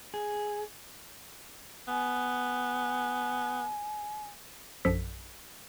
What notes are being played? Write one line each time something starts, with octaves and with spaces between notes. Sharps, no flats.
G#4
B3 G#5
A#1 F#2 F3 A4 B6